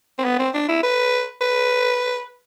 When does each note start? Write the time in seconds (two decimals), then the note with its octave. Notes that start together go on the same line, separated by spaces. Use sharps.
0.18 C4
0.24 B3
0.39 C4
0.54 D4
0.68 E4
0.83 B4
1.41 B4